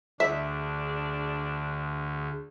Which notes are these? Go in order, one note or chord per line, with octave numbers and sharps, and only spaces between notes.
D2 D4 G#4 E5